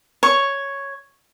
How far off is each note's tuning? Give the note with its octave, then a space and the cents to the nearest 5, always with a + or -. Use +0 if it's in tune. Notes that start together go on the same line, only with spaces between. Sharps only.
C#5 +0 C#6 +0